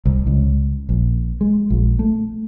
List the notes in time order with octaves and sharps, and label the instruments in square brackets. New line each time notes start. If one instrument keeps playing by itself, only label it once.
[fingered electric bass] C2
C#2
A#1
G#3
A#1
A3